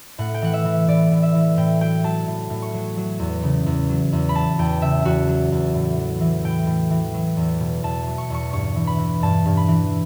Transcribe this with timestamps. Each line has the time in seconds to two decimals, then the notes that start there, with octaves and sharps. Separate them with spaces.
0.18 A2 F#5
0.34 G5
0.42 E3 F#5
0.54 E5
0.65 E3
0.88 A2 D5
1.11 A2
1.23 E5
1.34 E3
1.57 A2 G5
1.81 F#3 G5
2.04 F#3 A5
2.27 A2
2.50 A2
2.62 C#6
2.74 F#3
2.97 F#3
3.20 E2
3.43 C#3
3.66 E2
3.89 F#3
4.12 E2
4.29 B5
4.35 F#3 A5
4.59 E2 G5
4.82 C#3 E5
5.05 E2 F#4
5.29 F#3
5.52 E2
5.74 A2
5.97 E3
6.21 E3
6.44 A2 G5
6.67 A2
6.91 E3
7.14 F#3
7.37 E2
7.60 B2
7.83 E2 A5
8.07 F#3
8.18 C#6
8.30 E2 C#6
8.53 G2 C#6
8.76 E3
8.87 B5
8.99 E3
9.22 G2 A5
9.46 G2
9.57 B5
9.68 E3